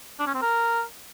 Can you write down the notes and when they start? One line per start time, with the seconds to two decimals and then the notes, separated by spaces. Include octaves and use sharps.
0.20 D4
0.27 C#4
0.34 C4
0.42 A#4